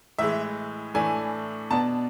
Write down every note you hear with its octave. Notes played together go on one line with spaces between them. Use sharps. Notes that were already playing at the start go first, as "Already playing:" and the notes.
A2 E3 G#3 E5
A2 E3 A3 D4 G#5
B2 B3 D4 A5